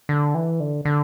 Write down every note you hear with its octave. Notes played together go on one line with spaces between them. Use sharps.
D3
E3
D3
D3